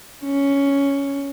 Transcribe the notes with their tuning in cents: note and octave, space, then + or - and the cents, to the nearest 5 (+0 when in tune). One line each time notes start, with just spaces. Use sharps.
C#4 +10